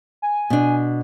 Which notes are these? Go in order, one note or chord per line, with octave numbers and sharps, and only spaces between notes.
G#5
B2 D4